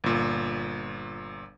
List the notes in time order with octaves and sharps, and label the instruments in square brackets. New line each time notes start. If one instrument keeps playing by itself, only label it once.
[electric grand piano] G1 A#2